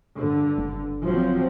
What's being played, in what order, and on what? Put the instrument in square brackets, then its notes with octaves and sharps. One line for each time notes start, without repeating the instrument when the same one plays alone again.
[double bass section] G2 D3
[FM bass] F#1
[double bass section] F3 F#3 C4